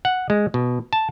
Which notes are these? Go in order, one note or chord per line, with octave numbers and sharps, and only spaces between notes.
F#5
G#3
B2
A5